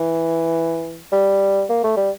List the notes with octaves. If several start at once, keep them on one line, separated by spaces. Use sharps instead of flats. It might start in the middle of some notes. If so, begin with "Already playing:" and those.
Already playing: E3
G3
A#3
A3
G3